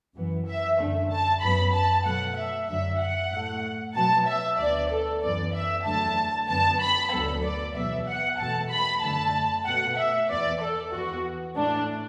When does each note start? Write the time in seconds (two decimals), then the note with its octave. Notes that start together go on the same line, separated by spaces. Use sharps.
0.15 F#2 E3 B3
0.46 E5
0.78 F#2 D3 A3
1.10 A5
1.41 F#2 F#3 B3 B5
1.73 A5
2.05 B2 F#3 A3 F#5
2.36 E5
2.68 F#2 D3 F#3 E5
3.00 F#5
3.31 A2 A3
3.95 B2 F#3 B3 A5
4.27 E5
4.58 D2 D3 B3 D5
4.90 A4
5.22 F#2 E3 B3 D5
5.54 E5
5.85 E2 D3 F#3 A3 A5
6.48 F#2 D3 B3 A5
6.80 B5
7.12 D2 D3 F#3 B3 A4
7.44 D5
7.75 E2 B2 F#3 B3 E5
8.07 F#5
8.38 E2 B2 A3 A5
8.70 B5
9.02 F#2 D3 A3 A5
9.65 B2 A3 F#5
9.97 E5
10.29 E2 E3 B3 D5
10.60 A4
10.92 E2 E3 B3 F#4
11.56 A2 A3 D4